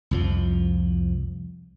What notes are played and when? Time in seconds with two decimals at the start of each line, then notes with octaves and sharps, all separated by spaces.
0.11 C2 F2 F3